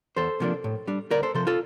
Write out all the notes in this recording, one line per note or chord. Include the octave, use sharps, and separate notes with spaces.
E2 A4 C5
C3 F3 A#3 D4
A2
G3 D4
D2 A#4 D5
A4 C5
C3 F3 A4 C5
F4 A4